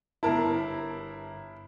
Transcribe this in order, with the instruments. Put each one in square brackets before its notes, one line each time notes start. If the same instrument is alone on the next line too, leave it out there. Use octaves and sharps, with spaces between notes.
[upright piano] G1 A#4 A5 [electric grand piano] E4